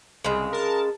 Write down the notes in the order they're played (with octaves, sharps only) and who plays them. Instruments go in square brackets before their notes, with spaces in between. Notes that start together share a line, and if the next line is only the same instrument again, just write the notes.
[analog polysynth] C2 [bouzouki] C#3 G#3
[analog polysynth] A#4 A5